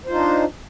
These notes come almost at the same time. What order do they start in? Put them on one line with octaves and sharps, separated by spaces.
C5 F4 D#4 D4